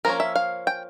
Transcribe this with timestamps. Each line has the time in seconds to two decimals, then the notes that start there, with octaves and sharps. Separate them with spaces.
0.05 F3 A#3 C#4 A#4
0.20 E5
0.36 F5
0.67 G5